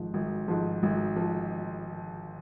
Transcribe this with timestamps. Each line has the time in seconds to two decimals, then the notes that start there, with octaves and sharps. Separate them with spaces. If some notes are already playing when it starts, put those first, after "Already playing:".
Already playing: G#1 G#2 F3
0.14 G#1
0.48 G#2 F3
0.83 G#1
1.16 F3